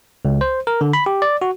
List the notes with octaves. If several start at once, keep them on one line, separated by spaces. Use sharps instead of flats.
C#2
C5
A#4
D3
B5
G4
D5
F#4